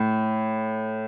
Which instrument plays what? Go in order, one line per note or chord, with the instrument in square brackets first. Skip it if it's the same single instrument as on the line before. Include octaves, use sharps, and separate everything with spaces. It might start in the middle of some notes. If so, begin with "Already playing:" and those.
Already playing: [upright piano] A2